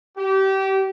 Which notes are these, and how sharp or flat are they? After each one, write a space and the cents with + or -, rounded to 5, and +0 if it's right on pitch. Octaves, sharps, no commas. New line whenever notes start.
G4 -25